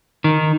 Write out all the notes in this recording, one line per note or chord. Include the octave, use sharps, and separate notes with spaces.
D#3